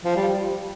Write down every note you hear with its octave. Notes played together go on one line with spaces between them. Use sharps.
F3
G3